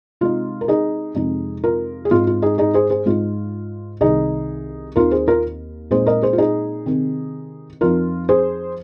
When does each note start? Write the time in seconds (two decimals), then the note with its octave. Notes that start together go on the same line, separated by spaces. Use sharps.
0.21 C3 G#3 D#4 F4
0.61 A#4
0.68 D#4 G#4
1.15 F2 C3 G#3 D#4
1.64 F4 A#4
2.05 G#4
2.11 G#2 G#3 C4 D#4 F4
2.27 F4
2.42 D#4 G#4
2.58 D#4 G#4
2.74 G#4 C5
2.90 G#4 C5
3.06 G#2 G#3 D#4 F4
4.00 C2 C3 D#3 D#4 G#4
4.96 D#2 D#3 C4 D#4 F4 A#4
5.11 G#4 C5
5.28 F4 A#4
5.91 A#2 G#3 C4 D#4 G#4 C5
6.07 A#4 D#5
6.22 G#4 C5
6.33 F4
6.38 D#4 G#4
6.86 C3 D#3 C4
7.81 F2 F3 C4 D#4 F4 A#4
8.29 G#4 C5